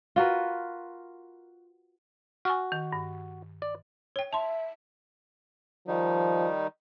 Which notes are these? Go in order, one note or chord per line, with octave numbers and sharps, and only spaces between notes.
F4 F#4 A#4 B4
F#4 G#5 C#6 F6
D#3
G2
D5
C#5 G5
E5 A5 C6
D#3 F3 G3 D#4